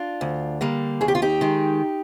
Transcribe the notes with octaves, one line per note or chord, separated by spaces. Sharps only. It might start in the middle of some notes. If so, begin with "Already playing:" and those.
Already playing: D4 F4
D2
D3 G3 A#3
D#2 G#4
G4
F4
D#4 G4
D#3 G#3